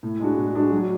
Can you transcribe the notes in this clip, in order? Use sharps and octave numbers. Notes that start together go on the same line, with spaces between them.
A2
G#3 D4 F#4
A2
G#3 D4 F#4
F#3